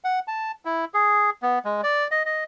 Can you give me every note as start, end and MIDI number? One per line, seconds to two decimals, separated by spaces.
0.04 0.20 78
0.28 0.52 81
0.65 0.85 64
0.94 1.30 68
1.43 1.59 59
1.65 1.81 56
1.83 2.08 74
2.11 2.23 75
2.26 2.44 75